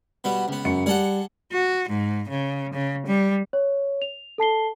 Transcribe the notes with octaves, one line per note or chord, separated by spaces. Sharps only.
B2 G3 B3
C#2 B3
F#2 C#7
G3 G#4 A4 F#5
F#4
G#2
C#3
C#3
G3
C#5
F7
A4 A5 C7 G7